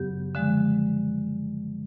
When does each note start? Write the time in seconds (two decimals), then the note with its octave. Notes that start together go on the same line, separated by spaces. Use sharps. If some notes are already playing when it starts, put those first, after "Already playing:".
Already playing: F#2 C#3 F#3 B3 G4
0.35 D3 F3 G#3